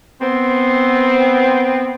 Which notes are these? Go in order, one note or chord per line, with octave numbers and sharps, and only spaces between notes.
B3 C4